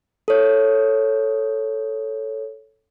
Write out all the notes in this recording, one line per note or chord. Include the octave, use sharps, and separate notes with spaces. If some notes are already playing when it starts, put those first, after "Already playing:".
A4 C#5